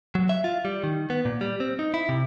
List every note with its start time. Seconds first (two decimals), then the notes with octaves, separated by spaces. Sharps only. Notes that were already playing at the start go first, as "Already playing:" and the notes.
0.15 F#3
0.29 E5
0.44 F4
0.65 G3
0.84 D#3
1.10 B3
1.25 A#2
1.41 G3
1.60 C4
1.79 D#4
1.94 E4
2.09 C3